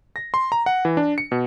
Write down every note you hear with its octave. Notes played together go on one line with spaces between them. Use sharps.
A#6
C6
A#5
F#5
E3
D4
C#7
B2